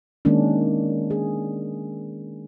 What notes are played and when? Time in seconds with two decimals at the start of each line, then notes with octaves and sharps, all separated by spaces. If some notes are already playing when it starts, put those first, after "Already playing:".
0.25 D#3 G#3 A#3 C#4 D4
1.10 G#4